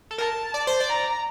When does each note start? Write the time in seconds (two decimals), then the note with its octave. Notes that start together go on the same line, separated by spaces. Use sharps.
0.11 A4
0.18 A#4 A5
0.54 D5
0.67 C5
0.80 D5
0.89 A#5